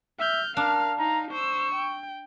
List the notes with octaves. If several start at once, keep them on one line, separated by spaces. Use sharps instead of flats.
E5 F6 G6
D4 A#4 F5 F6
D#4 F5 A#5
C5 C#6 E6
G5